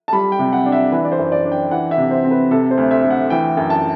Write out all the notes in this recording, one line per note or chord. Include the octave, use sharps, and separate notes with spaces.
A5
G3 B5
G5
C3
F#5
D4
E5
E3 B4
D5
C5
F#2
D5
D4
G5
E3 F#5
E5
C3
C5
C4
B4
C3 A4
C5
D2
E5
D2
F#5
E3 G5
F#2
A5